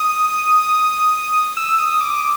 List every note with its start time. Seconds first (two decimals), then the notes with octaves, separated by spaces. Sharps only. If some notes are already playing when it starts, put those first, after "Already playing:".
Already playing: D#6
1.57 E6
1.78 D#6
2.01 D6